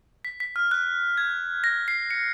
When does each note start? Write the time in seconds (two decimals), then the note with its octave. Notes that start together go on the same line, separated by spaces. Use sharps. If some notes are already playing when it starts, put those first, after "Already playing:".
0.25 B6
0.40 B6
0.56 F6
0.71 F#6
1.18 G#6
1.64 A#6
1.88 C7
2.11 C#7